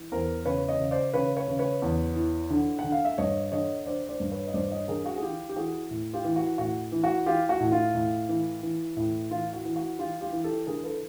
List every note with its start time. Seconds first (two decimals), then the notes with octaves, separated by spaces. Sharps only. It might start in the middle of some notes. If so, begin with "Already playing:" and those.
Already playing: E3
0.12 E2 A#4 C5
0.45 C#3 B4 C#5
0.68 C#5 D#5
0.80 C#3
0.91 C5 D5
1.14 C#3 B4 C#5
1.37 B4 C#5
1.48 C#3
1.59 B4 C#5
1.82 E2
2.16 E3
2.50 D3
2.79 F#5
2.84 D3
2.92 F5
3.05 E5
3.18 G2 C#5 D#5
3.52 D3 C#5 D#5
3.86 D3 C5 D5
4.09 C5 D5
4.20 G2
4.31 B4 C#5
4.47 D#5
4.54 G2 C5 D5
4.71 C#5 D#5
4.88 D3 G#4 A#4
5.05 F#4 G#4
5.16 G#4
5.22 E3 F4 G4
5.49 G4
5.56 E3 F#4 G#4
5.91 A2
6.13 F4 G4
6.25 E3
6.36 F#4
6.58 A2 F#4
6.92 E3
7.04 F#4
7.26 E3 F4 G4
7.49 F#4
7.60 A2
7.72 F4
7.95 A2
8.29 E3
8.63 E3
8.97 A2
9.31 E3 F4
9.53 F#4
9.65 E3
9.76 F#4
9.98 E3 F4 G4
10.21 F4 G4
10.32 E3
10.44 G4 A4
10.67 D3 G#4 A#4
10.84 A4 B4